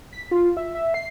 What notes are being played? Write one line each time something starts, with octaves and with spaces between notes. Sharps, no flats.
B6
F4
E5
E5
C7